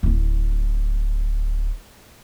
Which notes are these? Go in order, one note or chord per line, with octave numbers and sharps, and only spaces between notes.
D1 C4